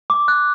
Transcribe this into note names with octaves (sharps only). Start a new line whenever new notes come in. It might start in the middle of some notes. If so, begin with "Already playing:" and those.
D6
F#6